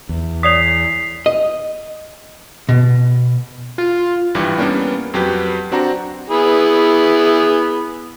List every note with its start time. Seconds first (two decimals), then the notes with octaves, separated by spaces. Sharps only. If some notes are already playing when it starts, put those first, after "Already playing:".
0.09 E2
0.43 C#5 D5 D#6 B6 C7 F7
1.26 D#5
2.69 B2
3.78 F4
4.35 G#1 G2 E3 G3
4.58 G3 A#3 B3 C#4 D4
5.14 F2 F#3 G4 B4 G6
5.72 C4 D4 F#4 A#5
6.30 B3 E4 G#4